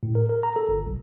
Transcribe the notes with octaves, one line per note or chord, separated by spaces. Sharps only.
A2
A#4
A#4
A#5
A4
G1
B1